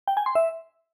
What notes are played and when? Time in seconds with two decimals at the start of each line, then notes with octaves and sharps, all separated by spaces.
0.08 G5
0.17 G#5
0.26 C6
0.35 E5